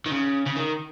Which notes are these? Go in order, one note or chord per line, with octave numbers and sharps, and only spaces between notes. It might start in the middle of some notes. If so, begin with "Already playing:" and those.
D#3
C#3
C#3
D#3